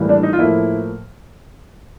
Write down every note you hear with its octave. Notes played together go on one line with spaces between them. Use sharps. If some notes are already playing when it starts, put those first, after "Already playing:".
Already playing: A2 E3 G3 A#3
D4
D#4
F4
A2 F3 A#3 E4